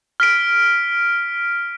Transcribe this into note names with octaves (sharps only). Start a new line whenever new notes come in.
F6 B6 D7